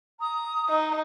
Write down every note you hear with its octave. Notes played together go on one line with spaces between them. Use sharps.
A#5 D#6
D#4